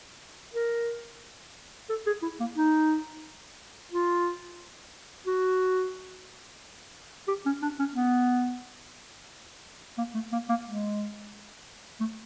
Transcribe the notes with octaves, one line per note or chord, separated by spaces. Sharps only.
A#4
A4
G#4
E4
A#3
D#4
F4
F#4
G4
C#4
D4
C#4
B3
A#3
A3
A#3
A#3
G#3
A3